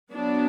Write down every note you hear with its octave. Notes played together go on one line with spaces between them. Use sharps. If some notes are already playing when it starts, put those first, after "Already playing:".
F#3 B3 D4